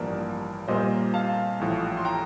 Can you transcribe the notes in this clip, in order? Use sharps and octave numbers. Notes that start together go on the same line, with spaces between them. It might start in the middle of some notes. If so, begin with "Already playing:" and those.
Already playing: A1 G2 F3 A#3 A#4 D5
A#2 G3 A#3 C5 D#5
F5 A5
A1 A2 F3
C6
G5 A#5